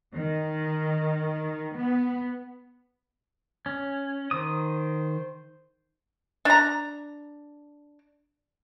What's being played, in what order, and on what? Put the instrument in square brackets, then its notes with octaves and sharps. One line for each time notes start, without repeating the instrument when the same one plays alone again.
[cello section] D#3
B3
[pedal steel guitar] C#4
[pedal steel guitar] D#3 D#6 [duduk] C5
[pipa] D4 A#5